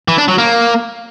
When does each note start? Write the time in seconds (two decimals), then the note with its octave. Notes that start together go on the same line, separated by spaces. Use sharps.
0.08 E3
0.18 D4
0.28 F#3
0.38 A#3